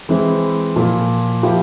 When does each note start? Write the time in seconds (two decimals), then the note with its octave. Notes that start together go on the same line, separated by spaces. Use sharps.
0.09 E3 G#3 C4 E4
0.76 A#2 F3 A#3
1.43 F3 A#3 E4 G4